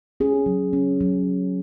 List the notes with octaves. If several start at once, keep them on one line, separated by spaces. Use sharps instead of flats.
C#4 G#4
F#3
C#4
F#3